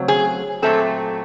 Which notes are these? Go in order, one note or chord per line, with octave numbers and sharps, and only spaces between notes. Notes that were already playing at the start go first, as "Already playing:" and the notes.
Already playing: C#3 F#3 A3 C4
G#4
A#2 F#3 A3 C4 A4